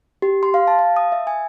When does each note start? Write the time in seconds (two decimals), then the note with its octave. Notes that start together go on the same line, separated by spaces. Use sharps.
0.22 G4
0.43 C6
0.54 F5
0.68 A5
0.79 F5
0.97 D#6
1.12 E5
1.27 G#5